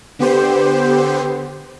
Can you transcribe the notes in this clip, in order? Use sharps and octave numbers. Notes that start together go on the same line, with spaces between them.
D3 B3 G4 C5